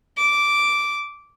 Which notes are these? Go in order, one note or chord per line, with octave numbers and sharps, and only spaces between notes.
D6